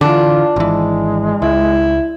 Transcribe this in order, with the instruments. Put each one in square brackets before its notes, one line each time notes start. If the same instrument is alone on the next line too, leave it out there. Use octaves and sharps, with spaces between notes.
[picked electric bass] D3 E3 [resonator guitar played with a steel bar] D4 [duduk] F4
[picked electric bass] G#1 E3 [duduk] G#3
[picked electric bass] C#2 [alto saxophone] E4